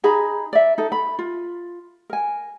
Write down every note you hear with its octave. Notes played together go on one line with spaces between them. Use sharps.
D#4 G#4 A#5 B5
D5 E5
D#4 A4
B5
F4
A#4 G#5